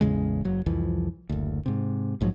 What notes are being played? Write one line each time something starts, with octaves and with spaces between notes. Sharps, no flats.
A1 E2 C#3 G#3
F#1 F#3
C2 F2 E3 F3
F#1 D2
G#2 C3
A#1 G#2 F3 F#3